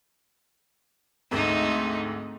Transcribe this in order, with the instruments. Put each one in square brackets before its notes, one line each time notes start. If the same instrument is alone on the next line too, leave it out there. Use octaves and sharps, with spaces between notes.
[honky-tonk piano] D2 G#2 C4 [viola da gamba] A3 D#4